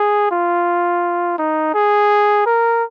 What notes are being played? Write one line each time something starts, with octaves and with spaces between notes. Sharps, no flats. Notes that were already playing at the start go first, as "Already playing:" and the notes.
Already playing: G#4
F4
D#4
G#4
A#4